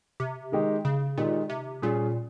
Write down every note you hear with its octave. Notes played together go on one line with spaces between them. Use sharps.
C3
D#3 G#3 D#4 G4
C#3
A#2 D#3 G#3 D#4 G4
C3
A#2 G3 C#4 F4 G#4